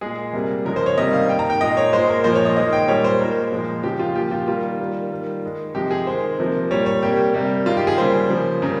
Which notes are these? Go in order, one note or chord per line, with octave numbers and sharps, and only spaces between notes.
A#2 G#3 G#4
C3 G3 A#3
C#3 F3 G#3 A#4
C5
C#5
C3 D#3 G3 A#3 D#5
F5
D#3 A#3 G5
A#5
G5
A#2 G#3 D#5
C#5
A#2 G#3 C5
A#4
A#2 F3 A#3 C5
C#5
D#5
D#3 G#3 D#5
G5
A#2 G3 A#3 C#5
C5
A#2 G#3 A#4
A#2 F3 G#3
C#3 F3 G#3 G4
F4
A#2 F3 A#3 G4
F4
D#3 G3 A#3 F4
D#3 G3 A#3
D#3 G3 A#3
D#3 G#3
C3 F3 G#3 G4
G#4
D#3 G#3 C5
C3 F3 A#3
A#2 G3 A#3 C#5
C#5
C3 G3 A#3 G4
C3 G3 A#3
D#3 G#3 F4
G4
G#4
C#3 G3 A#3 C5
C#3 F3 A#3
C#3 G3 A#3 A#4